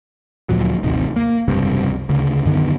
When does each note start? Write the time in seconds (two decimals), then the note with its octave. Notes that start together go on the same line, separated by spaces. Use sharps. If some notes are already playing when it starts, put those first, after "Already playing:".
0.49 D2 A#2 F3 F#3
0.83 A1 D#2 C3 D#3
1.16 A#3
1.48 F1 C#2 G2 C3
2.09 D2 C#3
2.46 F#2 D3 D#3 B3